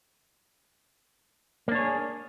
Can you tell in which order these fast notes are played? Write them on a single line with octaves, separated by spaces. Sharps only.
A#3 D4 C#5 G#4